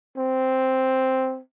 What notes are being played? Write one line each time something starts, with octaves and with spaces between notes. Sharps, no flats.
C4